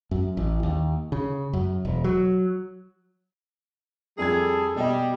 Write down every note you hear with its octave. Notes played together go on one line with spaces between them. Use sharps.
F#2
A1
D#2
C#3
F#2
E1
F#3
F2 G3 G#4 A4 G#6
B2 G3 D#5